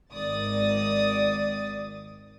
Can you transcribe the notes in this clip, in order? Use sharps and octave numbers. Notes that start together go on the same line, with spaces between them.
G#1 D#3 D5 D#6 A6